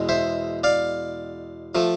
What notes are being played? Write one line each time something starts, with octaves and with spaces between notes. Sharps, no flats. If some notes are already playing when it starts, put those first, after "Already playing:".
Already playing: E2 B2 G#3
C5 E5
D5 F5
F3 A3